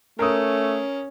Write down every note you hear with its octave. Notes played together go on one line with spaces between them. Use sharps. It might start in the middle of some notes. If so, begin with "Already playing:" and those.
A3 C#4 A#4 D#6